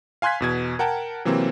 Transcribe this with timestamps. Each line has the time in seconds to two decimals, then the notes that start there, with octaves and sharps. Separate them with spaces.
0.22 F5 G#5 C6 F#6 G#6 B6
0.40 E2 B2 G#6
0.79 A#4 F#5 G5 A5
1.25 C3 E3 F#3 A#3 C4